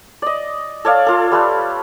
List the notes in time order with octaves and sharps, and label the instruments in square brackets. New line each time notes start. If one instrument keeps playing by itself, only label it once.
[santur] D5 D#5
A4 C#5 D5 F5
F4 A4
G3 A3 B4